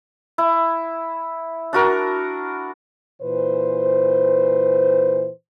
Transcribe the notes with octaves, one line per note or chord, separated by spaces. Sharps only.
E4
D4 F#4 A#4
A#2 E3 B4 C5